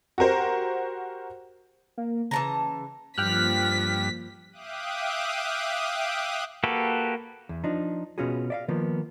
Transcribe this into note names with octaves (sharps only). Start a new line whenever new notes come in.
F#4 G4 A#4 C5
A#3
C#3 E3 A5 A#5
G2 F3 A#3 G5 F6 F#6 B6
E5 F5 G5 D6 D#6 F#6
A#3 F#4 G4 A4 B4
E2
F3 D4 D#4
B2 B3 C#4 F4 F#4 G#4
D5 E5 F5
D#3 F3 A#3 B3